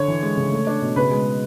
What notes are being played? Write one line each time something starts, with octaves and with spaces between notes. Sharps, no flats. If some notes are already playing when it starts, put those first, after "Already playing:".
Already playing: D3 C#5
E3
G#3
C#3
A3
D4
B2
C#3 B4
G#3